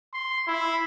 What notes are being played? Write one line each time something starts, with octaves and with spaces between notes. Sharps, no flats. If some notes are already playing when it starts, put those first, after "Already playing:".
C6
E4